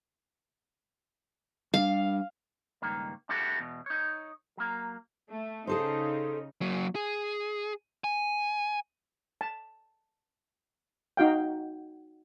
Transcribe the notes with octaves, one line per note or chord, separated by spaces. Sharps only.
G3 C4 D4 F5
C#2 G2 D#3 A#3
D4 E4 F#4 G4 A4
E2 B2
D#4 C#5
F#3 A#3
A3
C#3 D#4 G#4 A4 C5
F#3 A#3
G#4
G#5
A5
D#4 F#4 F5 G5